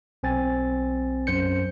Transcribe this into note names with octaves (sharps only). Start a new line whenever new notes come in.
B1 C4 G#5 A6
F#2 C5 G6 C#7